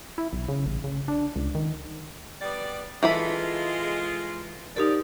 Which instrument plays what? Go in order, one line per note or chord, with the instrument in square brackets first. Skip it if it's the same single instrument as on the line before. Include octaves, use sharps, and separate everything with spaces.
[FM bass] E4
B1
C#3
A1
C#3
D4
C#2
D#3
[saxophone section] G3 B3 D5
[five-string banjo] E3 A4 B5 [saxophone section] G#3 F4
[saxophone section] G#2 F3 D5 [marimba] D#4 G4 A#4